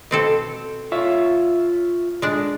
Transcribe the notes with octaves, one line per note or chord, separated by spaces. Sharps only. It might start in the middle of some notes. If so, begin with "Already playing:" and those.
B2 C4 A4
F4 C#5 E5
G#3 D4